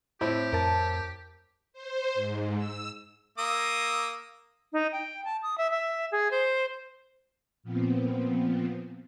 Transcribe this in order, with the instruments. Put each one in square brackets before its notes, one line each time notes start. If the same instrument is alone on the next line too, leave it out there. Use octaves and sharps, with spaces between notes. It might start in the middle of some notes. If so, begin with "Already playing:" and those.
[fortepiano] A2 C4 E4 [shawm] G4
[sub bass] F2 [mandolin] A#4 A5
[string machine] C5
G#2
E6
[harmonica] A#3 D#6 E6
[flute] D#4
G5
A5
D#6
E5
E5
G#4
C5
[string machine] A#2 F3 B3 C4